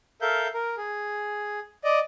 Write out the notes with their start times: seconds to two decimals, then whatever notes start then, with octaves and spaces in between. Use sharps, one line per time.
0.22 A4 A#4 E5 F5 G6
0.54 A#4
0.77 G#4
1.84 D5 D#5